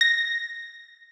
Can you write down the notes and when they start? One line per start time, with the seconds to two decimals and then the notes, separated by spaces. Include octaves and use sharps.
0.01 A#6